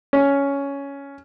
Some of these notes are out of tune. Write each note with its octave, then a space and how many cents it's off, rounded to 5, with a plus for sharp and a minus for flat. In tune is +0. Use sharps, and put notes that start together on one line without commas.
C#4 +10